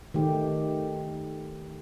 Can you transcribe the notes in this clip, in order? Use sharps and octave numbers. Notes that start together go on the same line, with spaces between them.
D#3 A3 G4